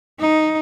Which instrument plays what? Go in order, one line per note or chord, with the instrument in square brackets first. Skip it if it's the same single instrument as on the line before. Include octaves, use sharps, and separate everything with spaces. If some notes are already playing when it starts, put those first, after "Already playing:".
[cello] D#4